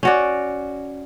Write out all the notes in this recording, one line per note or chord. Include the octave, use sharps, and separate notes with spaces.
C#4 F#4 D5